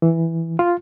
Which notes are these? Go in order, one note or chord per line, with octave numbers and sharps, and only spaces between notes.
E3
F4